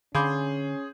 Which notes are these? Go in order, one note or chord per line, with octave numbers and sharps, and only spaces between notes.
D3 C#4 G#4 F5 B5 C6 D6 G6